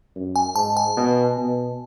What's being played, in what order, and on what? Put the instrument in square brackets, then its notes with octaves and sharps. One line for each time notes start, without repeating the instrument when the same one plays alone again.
[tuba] F#2
[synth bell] G#5
[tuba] G#2 [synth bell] A5
[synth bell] G#5
[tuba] B2
B2